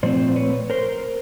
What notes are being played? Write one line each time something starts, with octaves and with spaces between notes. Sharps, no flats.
A#2 F3 A3 C4 C5 D5
B4 C#5
A#4 C5